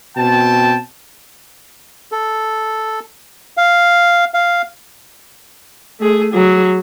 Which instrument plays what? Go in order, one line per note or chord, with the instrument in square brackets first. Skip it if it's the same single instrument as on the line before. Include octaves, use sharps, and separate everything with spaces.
[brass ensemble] B2 C4 G5 A5
[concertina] A4
F5
F5
[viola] A3 G#4
F#3 G#4